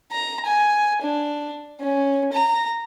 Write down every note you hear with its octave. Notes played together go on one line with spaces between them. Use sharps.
A#5
G#5
D4
C#4
A#5